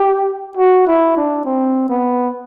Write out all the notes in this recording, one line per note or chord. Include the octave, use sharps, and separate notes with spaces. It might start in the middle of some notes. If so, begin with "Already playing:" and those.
Already playing: G4
F#4
E4
D4
C4
B3